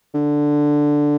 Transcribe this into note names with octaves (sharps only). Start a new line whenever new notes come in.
D3